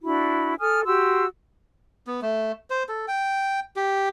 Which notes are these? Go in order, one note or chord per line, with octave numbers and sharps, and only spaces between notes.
D4 E4 F#4 B5
A4 G#5 D#6 F6
F#4 G4 C6 E6
B3
A3
C5
A4
G5
G4